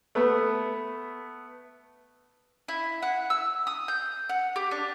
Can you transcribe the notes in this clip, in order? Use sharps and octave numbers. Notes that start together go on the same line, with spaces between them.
A3 B3 B4
E4
F#5
E6
D#6
G6
F#5
G4
D4